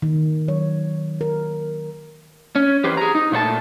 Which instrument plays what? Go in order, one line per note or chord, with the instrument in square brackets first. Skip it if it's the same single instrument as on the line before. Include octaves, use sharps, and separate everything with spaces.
[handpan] D#3
F#3 C#5
A#4
[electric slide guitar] C#4
E2 G4 B4 C5
G#4 A#5
D#4
A#2 A3 B4 A5